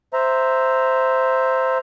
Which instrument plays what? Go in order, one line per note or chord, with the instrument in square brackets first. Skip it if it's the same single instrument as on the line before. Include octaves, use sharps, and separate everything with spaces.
[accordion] C5 E5 A#5